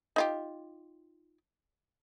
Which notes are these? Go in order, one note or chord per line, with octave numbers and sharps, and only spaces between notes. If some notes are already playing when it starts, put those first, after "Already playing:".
D#4 F4 G4